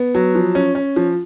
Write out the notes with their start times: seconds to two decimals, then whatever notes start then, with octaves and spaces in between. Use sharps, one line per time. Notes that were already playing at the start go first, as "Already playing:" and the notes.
Already playing: B3
0.15 F#3
0.35 F3
0.55 C#4
0.75 C#4
0.96 F3